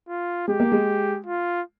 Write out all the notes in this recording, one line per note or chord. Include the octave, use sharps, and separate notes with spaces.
F4
G#3 G4
A#3
G#3
F4